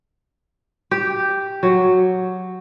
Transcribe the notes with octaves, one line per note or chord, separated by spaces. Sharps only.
G4
F#3